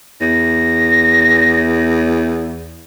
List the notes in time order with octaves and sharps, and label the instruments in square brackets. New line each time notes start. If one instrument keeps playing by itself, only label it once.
[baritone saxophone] E2 [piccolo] A#6